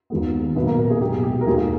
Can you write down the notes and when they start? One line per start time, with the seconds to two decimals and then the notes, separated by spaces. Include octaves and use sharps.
0.10 D#2 D#3 G#3 B3
0.56 B1 A#2 A#3 B3 B4
0.66 A#3 A#4
0.78 A#3 A#4
0.90 G#4
1.01 B1 B2 G#3 G4
1.23 G4
1.41 A#4
1.46 D#2 D#3 A#3 G#4
1.57 G#4